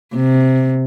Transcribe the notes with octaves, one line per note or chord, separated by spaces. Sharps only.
C3